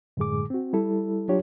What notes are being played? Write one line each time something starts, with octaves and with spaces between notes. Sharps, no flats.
F#2 A2 D3 G#3 G#4 D6
C4 F#4
G3 E4 A4
F#3 D4 F4 G4 C#5